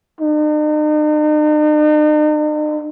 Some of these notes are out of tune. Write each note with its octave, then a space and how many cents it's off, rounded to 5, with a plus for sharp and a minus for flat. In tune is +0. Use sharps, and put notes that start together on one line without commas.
D#4 -45